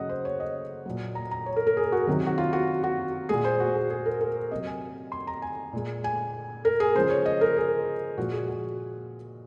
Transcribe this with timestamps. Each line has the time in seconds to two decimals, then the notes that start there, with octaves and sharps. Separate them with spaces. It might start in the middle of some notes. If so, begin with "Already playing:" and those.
Already playing: C#3 F#3 D#5 F#5
0.09 C5
0.25 C#5
0.40 D#5
0.86 A#2 F#3
1.15 A#5
1.31 A#5
1.46 C#5
1.56 A#4
1.67 A#4
1.77 G#4
1.92 F#4
2.07 C3 D#3 F#3
2.26 F#4
2.38 F4
2.53 F#4
2.83 F#4
3.29 A#2 G#3 G#4
3.44 C5
3.60 F#4
3.75 G#4
3.91 G#4
4.06 A#4
4.21 A#4
4.51 C3 F#3 D#5
4.67 G#5
5.12 C6
5.27 A#5
5.42 G#5
5.73 A#2 G#3
6.04 G#5
6.65 A#4
6.80 G#4
6.95 C#3 F3 G#3 C5
7.10 C#5
7.26 D#5
7.41 A#4
7.56 G#4
8.18 A#2 F3 G#3 F#4
8.33 G#4
8.48 F#4